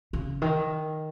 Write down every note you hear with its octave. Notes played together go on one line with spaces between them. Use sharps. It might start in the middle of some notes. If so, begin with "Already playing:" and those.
C#3
D#3